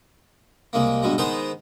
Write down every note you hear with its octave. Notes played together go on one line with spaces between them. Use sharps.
C2 G#3 A#3
G2 B2 G#3
D#3 G#3 B3 C5 A#5